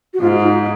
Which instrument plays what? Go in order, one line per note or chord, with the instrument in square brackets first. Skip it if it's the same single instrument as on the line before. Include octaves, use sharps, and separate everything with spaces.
[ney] F#4
[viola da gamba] G#2 [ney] F4
[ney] F4
D#4